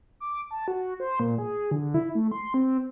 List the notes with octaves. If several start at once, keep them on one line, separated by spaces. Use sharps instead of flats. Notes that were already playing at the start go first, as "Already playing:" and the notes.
D6
A5
F#4
C5
A#2
G#4
D3
E4
A3
C6
C4